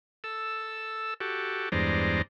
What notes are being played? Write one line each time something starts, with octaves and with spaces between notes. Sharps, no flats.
A4 E6
F#4 G4 A4
E2 G2 G#3 C5 D5 A#5